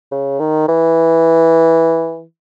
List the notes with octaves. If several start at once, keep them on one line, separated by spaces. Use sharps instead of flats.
C#3
D#3
E3